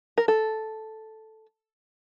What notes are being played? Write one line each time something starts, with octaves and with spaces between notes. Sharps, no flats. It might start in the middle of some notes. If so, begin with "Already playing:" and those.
A#4
A4